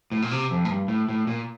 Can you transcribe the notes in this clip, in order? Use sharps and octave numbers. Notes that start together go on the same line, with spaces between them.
A2
A#2
C3
F2
A2
G2
A2
A2
A#2